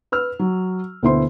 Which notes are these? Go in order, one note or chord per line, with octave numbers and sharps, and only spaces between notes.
B4 E6 F6
F#3
D2 B2 E4 C5 C6